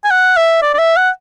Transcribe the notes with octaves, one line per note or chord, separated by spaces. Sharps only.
G#5
F#5
E5
D5
D5
E5
F#5